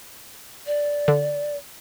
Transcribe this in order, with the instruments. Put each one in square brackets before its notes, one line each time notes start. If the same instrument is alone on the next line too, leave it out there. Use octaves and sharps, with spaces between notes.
[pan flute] D5
[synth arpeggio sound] D3